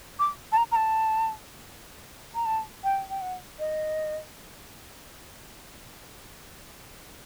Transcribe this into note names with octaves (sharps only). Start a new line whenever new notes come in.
D6
A5
A#5
A#5
A5
A#5
A5
G5
G5
F#5
D#5